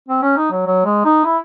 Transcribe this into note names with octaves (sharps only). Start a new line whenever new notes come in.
C4
C#4
D#4
F#3
F#3
G#3
D#4
E4